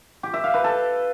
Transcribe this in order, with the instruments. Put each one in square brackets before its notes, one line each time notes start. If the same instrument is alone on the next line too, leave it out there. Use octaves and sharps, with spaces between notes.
[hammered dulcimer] G4
E5
F5
B4
A4